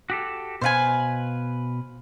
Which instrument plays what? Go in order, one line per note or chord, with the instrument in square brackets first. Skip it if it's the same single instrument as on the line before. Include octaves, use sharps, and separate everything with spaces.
[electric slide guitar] F#4 G4 A4
[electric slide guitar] B2 B4 [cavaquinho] C5 F5 G#5